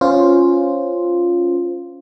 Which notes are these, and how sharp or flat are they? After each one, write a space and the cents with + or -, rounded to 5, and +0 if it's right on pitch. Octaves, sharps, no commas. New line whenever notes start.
C#4 +0 F4 +0 C5 +0